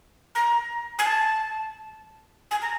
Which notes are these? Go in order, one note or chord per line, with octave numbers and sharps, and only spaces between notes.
A#5
G#5
A5
G#5
A#5